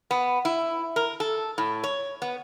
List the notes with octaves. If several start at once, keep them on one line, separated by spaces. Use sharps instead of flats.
B3
E4
A#4
A4
A2
C#5
B3